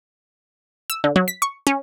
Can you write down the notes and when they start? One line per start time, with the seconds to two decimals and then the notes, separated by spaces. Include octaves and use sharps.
0.90 E6
1.04 D3
1.16 F#3
1.28 B6
1.42 C#6
1.67 C#4